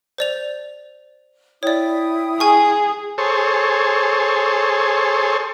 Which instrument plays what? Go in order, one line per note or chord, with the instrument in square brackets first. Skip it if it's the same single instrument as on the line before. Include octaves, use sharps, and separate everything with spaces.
[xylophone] C5 D5 F7
[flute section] E4 G5 D#6 [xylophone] C#5 D5
[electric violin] G#4 [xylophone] G#5 C#6
[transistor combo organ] G#4 A4 C5 C#5